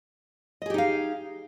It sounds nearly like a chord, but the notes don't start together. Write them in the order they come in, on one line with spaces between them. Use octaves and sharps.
D#5 G#4 G4 D#4 F5